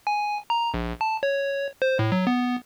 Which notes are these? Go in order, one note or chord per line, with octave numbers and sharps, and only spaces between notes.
G#5
A#5
A#1
A5
C#5
C5
A2
F#3
B3